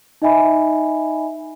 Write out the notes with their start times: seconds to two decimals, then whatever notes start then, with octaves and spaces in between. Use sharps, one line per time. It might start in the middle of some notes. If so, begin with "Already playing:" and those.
0.22 D#4 D#5 E5 G#5 B5